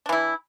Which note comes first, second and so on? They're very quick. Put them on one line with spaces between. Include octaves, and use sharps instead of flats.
D4 E3 E4